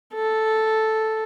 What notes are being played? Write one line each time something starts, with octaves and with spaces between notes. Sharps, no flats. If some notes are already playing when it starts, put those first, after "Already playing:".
A4